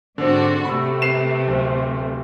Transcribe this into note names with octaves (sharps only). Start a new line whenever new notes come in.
G#2 D3 C4 D4 F#4
C3 A3 B5 E6
B4 C7 E7
D1 C4